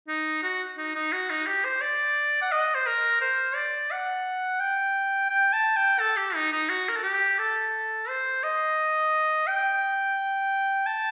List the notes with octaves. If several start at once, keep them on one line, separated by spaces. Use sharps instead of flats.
D#4
F#4
D#4
D#4
F#4
D#4
G4
C5
D5
F#5
D#5
C5
A#4
C5
D5
F#5
G5
G5
A5
G5
A4
G4
D#4
D#4
F#4
A#4
A4
G4
A4
C5
D#5
G5
A5